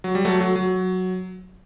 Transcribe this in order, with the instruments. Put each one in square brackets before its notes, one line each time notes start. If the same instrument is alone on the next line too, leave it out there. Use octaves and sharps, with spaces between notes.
[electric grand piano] F#3
G3
F#3 A3
F#3
F#3